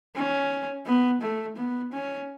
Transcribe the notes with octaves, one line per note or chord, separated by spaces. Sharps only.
C#4
B3
A3
B3
C#4